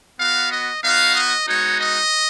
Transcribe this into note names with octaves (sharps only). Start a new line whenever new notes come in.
B3 F#4 F5
D#5
B3 D#4 F#4 F5
D#5
G#3 B3 D#4 F#4 C#5
D#5